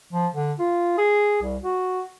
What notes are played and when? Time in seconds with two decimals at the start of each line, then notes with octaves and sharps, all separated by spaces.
0.13 F3
0.34 D3
0.59 F4
0.98 G#4
1.42 C2
1.63 F#4